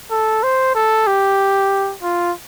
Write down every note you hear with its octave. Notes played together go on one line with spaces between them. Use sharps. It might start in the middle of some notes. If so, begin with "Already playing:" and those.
A4
C5
A4
G4
F4